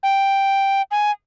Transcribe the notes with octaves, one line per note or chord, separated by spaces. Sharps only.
G5
G#5